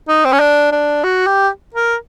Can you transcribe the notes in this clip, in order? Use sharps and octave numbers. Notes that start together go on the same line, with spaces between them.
D#4
C4
C#4
D4
D4
F#4
G4
A#4